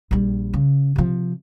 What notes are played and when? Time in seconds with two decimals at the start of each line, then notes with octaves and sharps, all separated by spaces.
0.11 A#1 G3
0.53 C#3
0.96 C3 F3